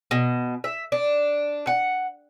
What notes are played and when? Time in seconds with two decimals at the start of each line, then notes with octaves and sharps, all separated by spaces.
0.11 B2
0.64 E5
0.92 D4
1.67 F#5